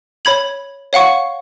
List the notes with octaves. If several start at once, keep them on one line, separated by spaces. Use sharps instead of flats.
C#5 B5 G#6 F#7
C#5 F5 F#5 C#6